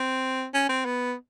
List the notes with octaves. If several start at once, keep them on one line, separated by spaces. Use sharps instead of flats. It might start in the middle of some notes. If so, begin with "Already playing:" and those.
Already playing: C4
C#4
C4
B3